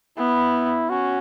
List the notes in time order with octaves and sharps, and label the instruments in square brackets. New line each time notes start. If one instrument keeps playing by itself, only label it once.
[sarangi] B3 [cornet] E4
[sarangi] C#4 [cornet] F#4